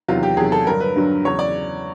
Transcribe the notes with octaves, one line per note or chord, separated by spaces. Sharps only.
E2 C3 D#3 F#3 F4
G4
E2 C3 D#3 F#3 G#4
A4
G2 D3 F#3 A#4
B4
G2 D3 F#3
E2 C#3 F#3 C#5
D5